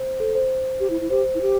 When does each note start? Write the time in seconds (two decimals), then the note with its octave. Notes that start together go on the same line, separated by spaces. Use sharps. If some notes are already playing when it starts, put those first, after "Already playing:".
Already playing: C5
0.20 A4
0.35 C5
0.80 G4
0.90 E4
1.01 E4
1.10 G4 C5
1.35 E4
1.41 G4